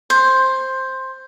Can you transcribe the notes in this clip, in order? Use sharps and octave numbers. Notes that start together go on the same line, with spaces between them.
C5